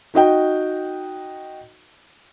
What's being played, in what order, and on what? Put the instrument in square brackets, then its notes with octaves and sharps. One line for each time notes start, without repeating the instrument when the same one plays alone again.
[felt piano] D#4 F#4 D#5 G5